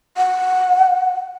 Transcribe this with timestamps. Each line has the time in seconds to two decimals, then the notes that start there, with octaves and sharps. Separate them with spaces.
0.17 F#5